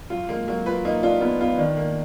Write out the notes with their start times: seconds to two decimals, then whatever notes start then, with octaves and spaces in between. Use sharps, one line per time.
0.10 F#3 F4
0.29 G#3 A#3
0.48 F#3 A#3
0.66 F4 B4
0.85 A#3 D#4
1.03 D4 F4
1.21 B3 F4
1.41 B3 F4
1.58 D#3 D4
1.77 A#3